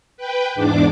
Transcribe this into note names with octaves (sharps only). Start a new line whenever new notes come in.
B4 G5
E2 G#2 D4 D6